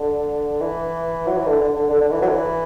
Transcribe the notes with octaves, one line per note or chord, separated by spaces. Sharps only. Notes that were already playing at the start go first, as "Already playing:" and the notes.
Already playing: D3
E3
F#3
E3
D3
D3
D3
D3
D3
E3
F#3
D3
E3